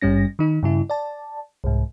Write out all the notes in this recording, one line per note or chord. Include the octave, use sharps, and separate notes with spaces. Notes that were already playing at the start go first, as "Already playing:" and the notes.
G#1 G2 G3 C#4 A#6
D#3 D#4
G2 C#3 E4
D5 A5
C2 G#2